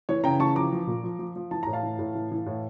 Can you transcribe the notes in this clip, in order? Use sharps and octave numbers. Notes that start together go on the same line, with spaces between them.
E3 C#5
C#3 G5 A#5
E3 A5 C#6
F3 A#5 D6
F3
A#2
F3
F3
F3
E3 A5
A2 A#5
F5 A5
E3
A2
E3
E3
A2